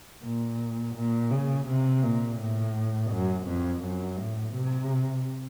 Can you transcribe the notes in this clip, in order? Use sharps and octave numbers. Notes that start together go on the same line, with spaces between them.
A#2
A#2
C#3
C3
A#2
A2
F#2
F2
F#2
A2
C3